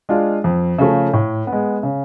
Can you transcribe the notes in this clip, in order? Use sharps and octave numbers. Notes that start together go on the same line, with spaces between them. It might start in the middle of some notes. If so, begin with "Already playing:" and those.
G#3 D4 F4
F2
C#3 F3 A3
A2
B3
G#3
C#3